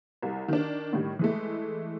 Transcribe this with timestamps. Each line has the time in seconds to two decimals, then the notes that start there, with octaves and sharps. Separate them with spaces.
0.22 C2
0.48 D#3 D4
0.93 A2 D#3 G3
1.19 E3 G#3 A3